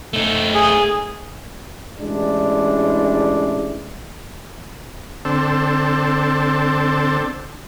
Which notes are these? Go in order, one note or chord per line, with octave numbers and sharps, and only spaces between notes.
A3 D#4
G#4
A1 G#3 D4 E4
D3 C4 A4